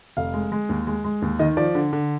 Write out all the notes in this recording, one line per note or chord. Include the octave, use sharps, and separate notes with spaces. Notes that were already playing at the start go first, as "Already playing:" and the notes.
F1 F5
G#3
G#3
D#2
G#3
G#3
D#2
D#3 D#5
F3 D5
D3
D3